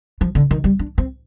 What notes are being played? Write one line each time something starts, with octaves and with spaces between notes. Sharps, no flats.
F3
D3
D#3
G3
D4
C4